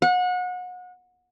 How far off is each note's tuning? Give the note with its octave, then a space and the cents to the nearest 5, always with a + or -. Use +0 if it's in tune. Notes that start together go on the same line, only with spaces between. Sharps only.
F#5 -30